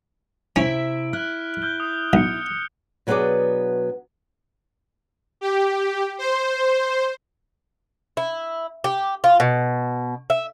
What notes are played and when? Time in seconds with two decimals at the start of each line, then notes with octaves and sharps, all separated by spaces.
0.56 C3 C#4 E4 E5 D7
1.13 E4 F6 F#6
1.62 F6 G6 G7
1.80 D#6
2.13 B1 F6 C#7
3.07 B2 F#3 B3 D4 G#4 D5
5.41 G4
6.18 C5
8.17 E4
8.84 G4
9.24 F4
9.40 B2
10.30 E5